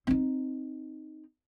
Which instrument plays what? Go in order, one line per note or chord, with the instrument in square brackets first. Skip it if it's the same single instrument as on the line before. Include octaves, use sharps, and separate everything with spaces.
[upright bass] C4 D#4